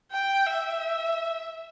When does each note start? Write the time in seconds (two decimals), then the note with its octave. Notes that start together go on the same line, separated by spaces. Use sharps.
0.12 G5
0.47 E5